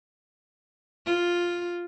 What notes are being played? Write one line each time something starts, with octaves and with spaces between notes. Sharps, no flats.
F4